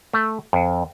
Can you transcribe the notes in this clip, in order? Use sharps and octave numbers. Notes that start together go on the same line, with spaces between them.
A3
F2